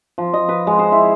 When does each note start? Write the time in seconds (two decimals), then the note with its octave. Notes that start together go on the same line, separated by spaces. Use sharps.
0.18 F3
0.33 D#5
0.49 B4
0.67 G#3
0.79 C5
0.92 E4